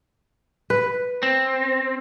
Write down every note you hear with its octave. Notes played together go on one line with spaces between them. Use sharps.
B4
C4